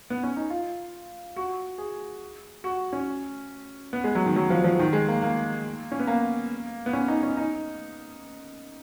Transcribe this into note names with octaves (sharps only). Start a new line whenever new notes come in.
B3
C#4
D#4
F4
F#4
G#4
F#4
C#4
B3
G#3
F#3
D#3
F#3
F3
F3
D#3
G#3
A#3
A#3
C#4
B3
A#3
B3
C#4
D#4
C#4
D#4